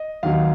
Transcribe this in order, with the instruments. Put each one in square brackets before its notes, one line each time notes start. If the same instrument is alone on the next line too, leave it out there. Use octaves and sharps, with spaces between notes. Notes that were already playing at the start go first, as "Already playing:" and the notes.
Already playing: [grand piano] D#5
D#2 D#3 F#3 F5